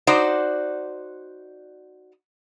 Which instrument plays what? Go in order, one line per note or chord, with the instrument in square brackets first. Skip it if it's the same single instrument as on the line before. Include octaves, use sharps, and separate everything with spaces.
[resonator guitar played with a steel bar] D#4 F#4 C5 D5